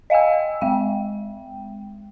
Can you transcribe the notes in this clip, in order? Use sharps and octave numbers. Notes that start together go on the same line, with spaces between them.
D#5 F5 G5 G#5 E6
G#3 G5